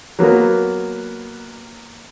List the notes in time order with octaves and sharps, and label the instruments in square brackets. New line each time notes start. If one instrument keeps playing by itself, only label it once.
[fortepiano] F#3 A#3 B3